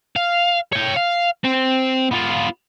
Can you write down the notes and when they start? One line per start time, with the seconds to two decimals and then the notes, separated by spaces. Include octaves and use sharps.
0.16 F5
0.73 C#5 G5
0.96 F5
1.45 C4
2.11 B3 F4